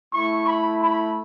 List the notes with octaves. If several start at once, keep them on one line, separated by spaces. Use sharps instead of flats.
A3 E4 C#6
B5
B5